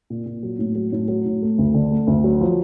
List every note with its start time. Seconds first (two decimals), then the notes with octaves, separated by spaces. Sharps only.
0.10 A#2
0.26 A#2
0.43 F#3
0.59 A2
0.75 F#3
0.92 A2
1.08 F#3
1.25 A2
1.42 A3
1.58 D2
1.74 D3
1.91 A3
2.07 D2
2.24 F#3
2.41 F3